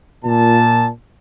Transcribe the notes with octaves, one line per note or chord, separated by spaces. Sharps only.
A#2 A5